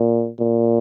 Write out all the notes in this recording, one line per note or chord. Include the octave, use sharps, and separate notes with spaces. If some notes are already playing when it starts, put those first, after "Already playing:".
Already playing: A#2
A#2